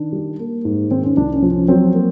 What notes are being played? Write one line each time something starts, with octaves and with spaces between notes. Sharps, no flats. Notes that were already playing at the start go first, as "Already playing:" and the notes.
Already playing: D#3 D4
G3
A#3
G#2
D#3 C4
C#4
C2 D4
C#4
F3
C#4
F#3 C4
A#3